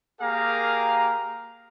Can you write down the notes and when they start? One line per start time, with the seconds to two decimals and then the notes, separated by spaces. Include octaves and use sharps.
0.21 A#3 G4 G#4 A#4 F5 A#5